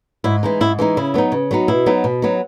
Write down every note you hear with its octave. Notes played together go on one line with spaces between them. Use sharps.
G#2 E4
E3 G#3 D#4
G#2 E4
E3 G#3 D#4
C#3 E4
F#3 B3 D#4
C#3
F#3 B3 D#4
B2 E4
F#3 B3 D#4
B2
F#3 B3 D#4